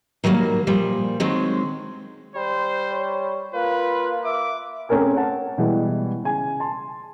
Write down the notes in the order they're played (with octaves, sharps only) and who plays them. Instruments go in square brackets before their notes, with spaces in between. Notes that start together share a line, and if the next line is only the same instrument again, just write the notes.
[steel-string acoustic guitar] D#3 F#3 G3 A3 A#3
A#2 F3 G3
D#3 F#3 G#3 C4
[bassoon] G3 [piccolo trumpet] C5
[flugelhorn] C#5
[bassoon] A#3 [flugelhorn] F4 [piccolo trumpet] B4
[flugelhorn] E5 [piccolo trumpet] D6
[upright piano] A3 C4 C#4 G#4 A#4 G#5
C#5 F#5 A5
B2 E3 G3 G#3
C#3 G#5
A5 C6